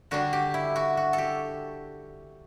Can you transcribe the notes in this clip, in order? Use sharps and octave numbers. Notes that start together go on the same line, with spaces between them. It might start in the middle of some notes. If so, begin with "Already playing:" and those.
D3 G3 D4 F#4
G4
E4
F#4
F#4
A4
G4